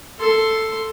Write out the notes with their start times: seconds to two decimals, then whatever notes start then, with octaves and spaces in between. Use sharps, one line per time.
0.19 A4 C6